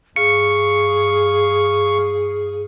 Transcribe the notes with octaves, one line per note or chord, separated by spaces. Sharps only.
G2 G#4 F5 C#6 C#7